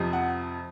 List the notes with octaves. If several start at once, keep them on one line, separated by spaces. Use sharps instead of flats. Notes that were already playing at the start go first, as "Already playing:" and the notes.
Already playing: F2 C3 F3
F#5